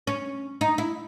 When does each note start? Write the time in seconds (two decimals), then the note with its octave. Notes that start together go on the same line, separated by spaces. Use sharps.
0.07 C#4
0.61 D#4
0.78 E4